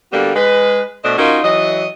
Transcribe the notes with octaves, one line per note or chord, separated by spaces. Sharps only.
D3 G3 A#3 B3 F#4
G#3 B4
B2 A3 D4 C5 D#5
C#4 D#4 F4 F#4 A#4
E3 F#3 D#5